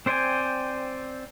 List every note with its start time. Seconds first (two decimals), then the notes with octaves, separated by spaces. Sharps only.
0.06 C4 C5 D5 G5 G#5